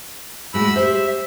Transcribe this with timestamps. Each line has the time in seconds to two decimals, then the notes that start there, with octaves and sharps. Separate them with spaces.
0.54 A2 G#3 F#4 B5 E6
0.76 G4 C5 E5